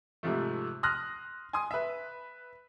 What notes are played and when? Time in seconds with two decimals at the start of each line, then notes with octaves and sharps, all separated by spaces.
0.23 G#2 C3 F3 A3
0.83 C6 D#6 F6 F#6 A#6
1.53 G#5 C6 D#6
1.71 B4 E5